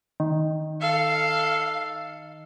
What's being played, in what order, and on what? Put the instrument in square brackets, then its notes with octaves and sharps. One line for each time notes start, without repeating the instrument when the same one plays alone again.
[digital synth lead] D#3
[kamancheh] A4 F5